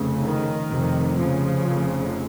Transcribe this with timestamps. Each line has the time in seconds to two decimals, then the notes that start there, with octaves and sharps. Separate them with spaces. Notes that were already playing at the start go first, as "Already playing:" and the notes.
Already playing: F1 F2 C#3
0.21 D#3
0.70 F1 F2 C3
1.17 C#3 F3
1.65 F1 F2 C3